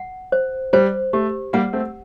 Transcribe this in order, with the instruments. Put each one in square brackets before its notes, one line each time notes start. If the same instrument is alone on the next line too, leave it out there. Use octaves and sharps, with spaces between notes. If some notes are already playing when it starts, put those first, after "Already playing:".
Already playing: [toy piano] F#5
C5
[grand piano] G3 [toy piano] C5
[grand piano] A3 [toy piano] G4
[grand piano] G3 A#3 [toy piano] F#5
[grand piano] A3 C4